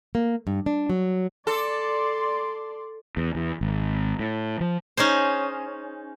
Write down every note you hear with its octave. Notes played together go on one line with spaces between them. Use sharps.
A#3
G2
D4
F#3
A4 D5 C6
E2
E2
G#1
A2
F3
C#4 D#4 G#4 C5